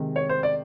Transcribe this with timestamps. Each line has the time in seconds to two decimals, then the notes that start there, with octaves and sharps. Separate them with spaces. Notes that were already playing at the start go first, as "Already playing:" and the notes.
Already playing: C3 D#3 G#3
0.16 C#5
0.29 C5
0.43 D5